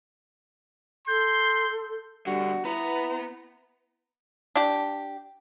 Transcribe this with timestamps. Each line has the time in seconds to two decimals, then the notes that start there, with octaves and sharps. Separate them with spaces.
1.08 A4 C6 G6
2.27 B2 D3 G3 F#4
2.65 B3 E4 B4 A#5
4.56 D4 G4